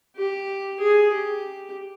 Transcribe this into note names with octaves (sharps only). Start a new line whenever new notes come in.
G4
G#4
G4